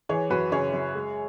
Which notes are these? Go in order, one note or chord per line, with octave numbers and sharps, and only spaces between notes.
E3 G#4 C#5
F#2 F#4 B4
C#3 G#4 C#5
F#2
G#3